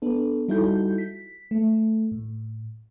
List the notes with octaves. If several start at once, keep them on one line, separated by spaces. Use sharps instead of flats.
B3 D4 A4
G3 D#4 E4 F#4 A4 G6
B6
A3
A2